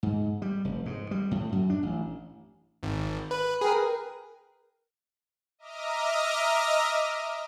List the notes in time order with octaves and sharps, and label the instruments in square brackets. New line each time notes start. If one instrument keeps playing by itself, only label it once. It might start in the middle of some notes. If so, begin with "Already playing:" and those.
[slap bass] G#2
G3
F1
G#2
G3
A2
F#2
D4
A1
[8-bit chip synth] G#1
B4
[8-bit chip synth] G#4 [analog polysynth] A#4 B4 G5
[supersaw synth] D#5 E5 A#5 D6 D#6 F6